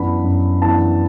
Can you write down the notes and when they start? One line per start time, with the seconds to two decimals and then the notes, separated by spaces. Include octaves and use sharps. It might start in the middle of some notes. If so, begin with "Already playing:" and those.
Already playing: F#2 E3 B3 D4 B5
0.24 F#2
0.61 E3 B3 D4 A5